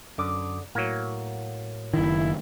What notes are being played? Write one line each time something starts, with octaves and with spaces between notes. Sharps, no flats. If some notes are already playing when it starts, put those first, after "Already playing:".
F#2 D3 D6 D#6
A2 F#3 A#3
F#1 D#3 E4